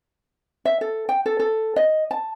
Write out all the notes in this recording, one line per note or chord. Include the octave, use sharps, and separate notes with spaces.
E5
A4
G5
A4
A4
D#5
A5